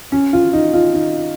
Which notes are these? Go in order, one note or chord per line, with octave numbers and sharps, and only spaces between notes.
C#4
F4
D#4
F4
D#4